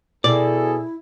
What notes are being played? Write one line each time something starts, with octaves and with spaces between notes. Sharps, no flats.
B2 E4 G#4 A4 D5